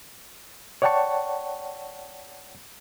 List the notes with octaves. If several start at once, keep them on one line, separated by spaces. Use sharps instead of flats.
C#5 D5 F#5 G5 A5 C#6